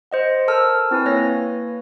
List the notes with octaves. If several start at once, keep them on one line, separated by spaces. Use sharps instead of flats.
C5 D#5 F#5
A4 A#4 A5 E6 F6
C4 E4 B4 G#5
A#3 B4 C#5 A#6